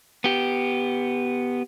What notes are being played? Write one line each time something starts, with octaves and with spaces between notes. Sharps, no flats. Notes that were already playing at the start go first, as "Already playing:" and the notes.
B3 G4